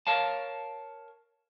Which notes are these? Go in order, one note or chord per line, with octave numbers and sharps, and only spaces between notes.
A#4 C#5 F5 A5